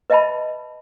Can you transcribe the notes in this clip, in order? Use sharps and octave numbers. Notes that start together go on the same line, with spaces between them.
B4 D#5 E5 G5 A5 B5